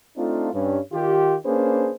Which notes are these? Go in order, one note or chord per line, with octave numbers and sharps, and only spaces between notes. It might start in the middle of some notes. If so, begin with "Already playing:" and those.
A3 C4 D4 D#4 F4
G2 C#4
D#3 F4 G4
A#3 C#4 D4 G#4 B4 C5